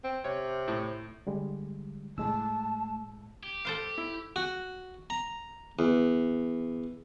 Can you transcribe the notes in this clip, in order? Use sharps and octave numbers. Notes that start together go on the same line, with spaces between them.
C4
C3 C#5
A2
D3 G3 G#3
A2 G#3 A3 A5 E6
G4
A4 C5 F5
E4
F#4
A#5
E2